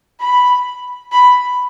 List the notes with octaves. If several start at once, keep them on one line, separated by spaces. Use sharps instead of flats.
B5
B5